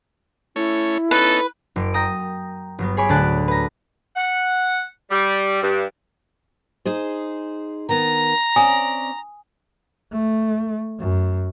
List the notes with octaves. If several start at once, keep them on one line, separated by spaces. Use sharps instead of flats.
A3 C#4 E4 C#5
B3 C#4 D#4 A4 B4
F#1 D7
G5 A#5 D#6
G1 F#3 B3
G#4 C#5 G#5 B5 D6
D2 A2 D4 D5 A5 F#6
B4 A#5
F#5
G3
G2
D#4 G#4 C5
D#3 B3 A#5
C4 C#4 D5 G#5 D#6
A3
F#2